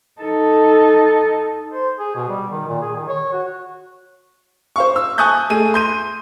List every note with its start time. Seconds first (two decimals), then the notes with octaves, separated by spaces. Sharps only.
0.21 D#4 A4
1.72 C5
1.99 G#4
2.15 B2
2.29 G3
2.51 D#3
2.68 A#2
2.82 G#4
2.96 D#3
3.08 C#5
3.33 F#4
4.76 C5 F5 C#6
4.96 E6
5.18 G#5 A5 C#6 D#6 F#6 G6
5.50 A3 G#4 D#7
5.74 C6 G6 D#7